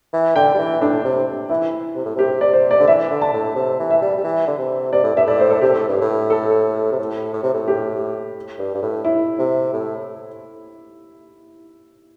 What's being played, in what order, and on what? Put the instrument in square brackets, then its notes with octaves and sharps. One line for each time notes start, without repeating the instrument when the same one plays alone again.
[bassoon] E3
[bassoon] D3 [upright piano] G5
[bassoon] G3
E3
[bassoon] A2 [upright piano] D4
[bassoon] C3
[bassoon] E3 [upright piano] E4
[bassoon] C3
A2
[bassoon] C3 [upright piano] G4
[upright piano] D5
C5
D5
[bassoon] D3
[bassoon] E3 [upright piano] E5
[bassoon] D3
[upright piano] A5
[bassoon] A2
C3
E3
[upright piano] E5
[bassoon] G3
G3
E3
D3
C3
[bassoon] C3 [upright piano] D5
[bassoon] A2
[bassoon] G2 [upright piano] E5
[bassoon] A2 [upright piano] D5
[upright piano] C5
A4
[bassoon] C3 [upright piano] G4
[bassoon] A2
G2
A2
[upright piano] A4
[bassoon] C3
A2
A2
C3
A2
[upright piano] G4
[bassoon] G2
G2
A2
[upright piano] E4
[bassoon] C3
A2